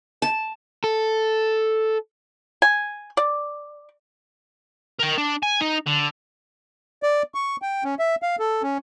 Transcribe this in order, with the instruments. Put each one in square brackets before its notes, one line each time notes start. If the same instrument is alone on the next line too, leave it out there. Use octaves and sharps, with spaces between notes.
[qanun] A5
[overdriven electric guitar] A4
[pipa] G#5
D5
[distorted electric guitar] A#4 G5
D4
G#5
D#4
D3
[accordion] D5
C#6
G5
C#4
E5
F5
A4
C#4